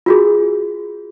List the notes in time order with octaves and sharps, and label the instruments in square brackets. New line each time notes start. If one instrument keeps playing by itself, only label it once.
[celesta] F4 F#4 G#4